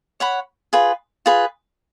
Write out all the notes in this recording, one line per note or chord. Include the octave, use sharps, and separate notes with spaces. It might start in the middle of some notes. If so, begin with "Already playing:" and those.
C#5 F#5 B5
F4 G#4 B4
F4 G#4 B4